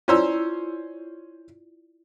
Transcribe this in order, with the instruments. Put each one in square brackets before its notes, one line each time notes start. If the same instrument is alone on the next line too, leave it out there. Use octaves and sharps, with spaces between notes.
[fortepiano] C#4 C5 E6 [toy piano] E4 F4 D5